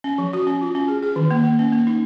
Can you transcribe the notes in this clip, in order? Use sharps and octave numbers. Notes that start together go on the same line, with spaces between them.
C#4
F3
F#4
C#4
F4
C#4
G#4
G#4
D#3
A#3
A#3
C#4
A#3
D#4